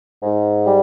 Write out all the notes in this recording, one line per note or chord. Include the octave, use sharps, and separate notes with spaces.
G#2
G3